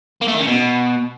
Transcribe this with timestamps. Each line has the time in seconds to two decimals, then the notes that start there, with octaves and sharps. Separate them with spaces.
0.22 A#3
0.28 A3
0.35 D#3
0.41 C#3
0.47 B2